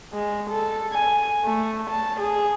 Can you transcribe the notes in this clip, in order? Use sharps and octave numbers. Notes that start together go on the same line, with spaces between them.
G#3
A4
G#5
A3
A5
G#4